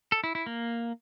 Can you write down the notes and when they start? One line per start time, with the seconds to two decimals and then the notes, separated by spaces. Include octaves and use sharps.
0.12 A4
0.24 E4
0.35 E4
0.46 A#3